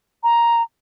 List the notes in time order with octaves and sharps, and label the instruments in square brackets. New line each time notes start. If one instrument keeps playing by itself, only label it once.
[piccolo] A#5